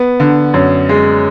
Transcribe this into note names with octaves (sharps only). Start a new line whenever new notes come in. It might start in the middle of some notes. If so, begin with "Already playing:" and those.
Already playing: B3
D3
F#2
G#3